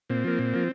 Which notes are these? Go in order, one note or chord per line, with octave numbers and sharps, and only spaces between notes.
A#2 C4
F3 A#3
A#2
F3 A#3